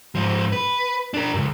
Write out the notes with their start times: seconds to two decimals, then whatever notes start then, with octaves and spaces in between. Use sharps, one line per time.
0.15 G#2 F3
0.52 B4
1.14 D4 A#4
1.34 C#2 F#2